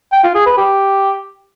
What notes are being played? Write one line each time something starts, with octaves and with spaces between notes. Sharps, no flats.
G5
F4
G#4
B4
G4